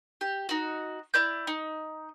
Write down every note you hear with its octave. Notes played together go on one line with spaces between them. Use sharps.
G4
D#4 F#4
E4 D5 G6
D#4